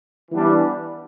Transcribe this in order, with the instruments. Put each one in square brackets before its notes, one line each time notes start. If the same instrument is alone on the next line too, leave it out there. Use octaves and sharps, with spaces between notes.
[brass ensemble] E3 G3 B3 D4